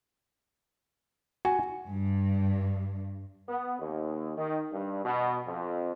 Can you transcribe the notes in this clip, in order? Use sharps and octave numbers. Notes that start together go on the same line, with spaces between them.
F#4 G#5
G2
B3
D#2
D#3
G2
B2
F2